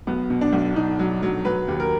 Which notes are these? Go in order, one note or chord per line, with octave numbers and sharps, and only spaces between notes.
B1 B3
B2
D4
B1
B2 D#4
F#3
F#3
F#3 B4
D#2
A#4